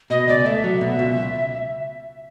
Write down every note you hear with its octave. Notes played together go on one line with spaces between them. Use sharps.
B2 D#5
C#2 D5
A3 E5
F#3
B2
C#2